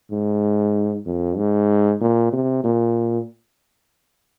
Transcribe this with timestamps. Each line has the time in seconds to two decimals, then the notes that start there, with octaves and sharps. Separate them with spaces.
0.11 G#2
1.06 F2
1.37 G#2
2.01 A#2
2.33 C3
2.64 A#2